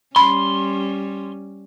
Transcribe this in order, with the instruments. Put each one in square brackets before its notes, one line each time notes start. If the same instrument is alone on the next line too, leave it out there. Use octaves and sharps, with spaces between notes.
[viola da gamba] G3 C#4 [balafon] B5 [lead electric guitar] C6